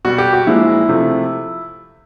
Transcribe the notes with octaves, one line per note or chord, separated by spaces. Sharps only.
B2 G3 F#4
G4
F#4
A#2 F3 G#3 E4
C3 F3 A3